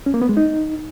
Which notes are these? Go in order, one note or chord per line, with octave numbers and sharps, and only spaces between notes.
C#4
A#3
B3
G#3
D#4